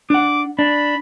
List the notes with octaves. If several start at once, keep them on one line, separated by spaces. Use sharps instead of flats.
D4 F#5 D6
D4 B5